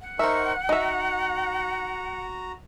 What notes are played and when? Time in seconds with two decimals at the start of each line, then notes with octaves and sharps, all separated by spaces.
0.02 F#5
0.19 D#4 A#4 C5 E5 C#6
0.69 D#4 F#4 E5 A#5